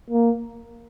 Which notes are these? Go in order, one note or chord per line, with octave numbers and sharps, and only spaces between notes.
A#3